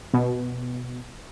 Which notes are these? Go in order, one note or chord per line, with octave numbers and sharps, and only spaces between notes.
B2